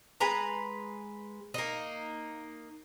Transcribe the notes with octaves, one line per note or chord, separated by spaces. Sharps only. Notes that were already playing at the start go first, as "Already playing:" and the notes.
G#3 B4 A#5
A#3 D#4